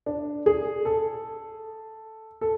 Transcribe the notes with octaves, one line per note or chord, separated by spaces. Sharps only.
D4
G#4
A4
A4